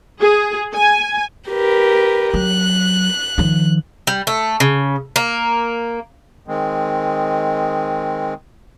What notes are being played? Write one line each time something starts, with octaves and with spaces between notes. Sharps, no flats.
G#4
G#5
G4 A#4 B4
F#3 F#6
D#3 F3
G3
A3
C#3
A#3
D#3 G#3 C4